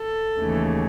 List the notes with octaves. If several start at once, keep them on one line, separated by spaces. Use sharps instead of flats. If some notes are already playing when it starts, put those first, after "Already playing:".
Already playing: A4
D#2 C#3 E3 A3